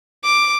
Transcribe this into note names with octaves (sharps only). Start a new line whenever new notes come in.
D6